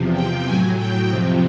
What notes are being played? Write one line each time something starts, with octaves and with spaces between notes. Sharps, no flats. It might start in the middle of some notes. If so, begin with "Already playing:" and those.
Already playing: E2 C3 F3
G5
A2 F#3 G#5
G5
F2 C3 F3